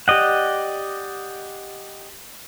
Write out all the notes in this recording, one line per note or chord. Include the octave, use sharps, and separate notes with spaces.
G4 D5 D#5 F#5